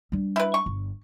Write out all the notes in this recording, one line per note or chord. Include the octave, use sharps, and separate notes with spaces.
G3 D4
E4 B4
C#6
G1